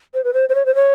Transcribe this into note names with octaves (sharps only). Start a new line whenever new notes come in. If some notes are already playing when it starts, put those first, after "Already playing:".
C5
B4
C5
C5
C#5
C5
C#5